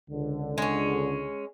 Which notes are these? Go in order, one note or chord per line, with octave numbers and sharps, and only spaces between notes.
C#2 D3
G#3 C#4